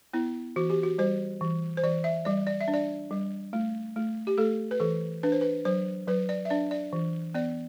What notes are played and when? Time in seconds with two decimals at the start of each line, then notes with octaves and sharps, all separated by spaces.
0.13 B3 E4
0.56 E3 F#4
0.70 G4
0.83 F#4
0.98 G3 C5
1.41 E3
1.77 C5
1.83 E3 D5
2.04 E5
2.25 G3 D5
2.47 D5
2.61 E5
2.68 D4
2.74 D5
3.11 G3
3.53 A3
3.96 A3
4.27 G4
4.38 A3 A4
4.71 B4
4.80 E3 A4
5.23 D4 B4
5.32 C5
5.41 B4
5.65 F#3 C5
6.08 F#3 B4
6.29 D5
6.45 E5
6.50 D4 D5
6.71 D5
6.93 E3
7.35 B3 D5